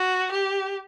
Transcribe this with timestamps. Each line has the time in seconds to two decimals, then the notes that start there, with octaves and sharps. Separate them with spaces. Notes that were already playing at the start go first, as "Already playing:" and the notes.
Already playing: F#4
0.32 G4